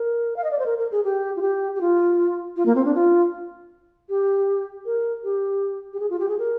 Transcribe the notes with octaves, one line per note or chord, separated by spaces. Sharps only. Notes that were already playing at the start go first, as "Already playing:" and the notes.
Already playing: A#4
F5
D#5
D5
C5
A#4
A#4
G#4
G4
F4
G4
G4
F4
F4
A#3
C4
D4
F4
G4
A#4
G4
G4
G#4
F4
G4
G#4
A#4